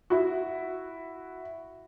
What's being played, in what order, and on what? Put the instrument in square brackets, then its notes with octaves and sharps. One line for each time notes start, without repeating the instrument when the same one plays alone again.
[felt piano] E4 F#4